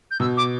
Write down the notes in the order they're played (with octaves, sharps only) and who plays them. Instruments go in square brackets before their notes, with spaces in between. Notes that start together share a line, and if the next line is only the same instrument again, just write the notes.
[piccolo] G6
[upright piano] B2 [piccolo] E6
[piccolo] D6